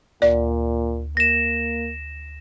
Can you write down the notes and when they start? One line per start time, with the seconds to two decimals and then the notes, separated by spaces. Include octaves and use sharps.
0.22 D2 A#2 D5
1.17 A#3 A#6 E7